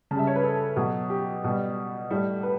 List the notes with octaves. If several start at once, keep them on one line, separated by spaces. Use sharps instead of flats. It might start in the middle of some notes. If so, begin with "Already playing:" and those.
C#3 G3 E5 A5
C#5
B4
A4
B2 F#3
G4
B2 G3
A2 G3
B4